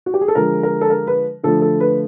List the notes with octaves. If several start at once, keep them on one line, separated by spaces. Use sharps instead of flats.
F#4
G4
G#4
A4
D3 F3 G#3 A#4
A#4
A4
A#4
B4
D3 F3 A3 A4
A4
B4